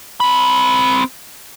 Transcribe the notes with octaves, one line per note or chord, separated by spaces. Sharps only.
C4 B5